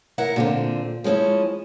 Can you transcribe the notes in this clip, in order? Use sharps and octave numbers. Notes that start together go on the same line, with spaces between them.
E4 A#4 F#5
A#2 D3 C4
F3 G#3 C#4 E4